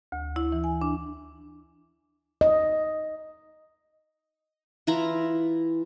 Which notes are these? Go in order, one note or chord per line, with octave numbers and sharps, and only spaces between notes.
D2
E4
E3
G#5
D4
D#5
E3 E4 F4 A#5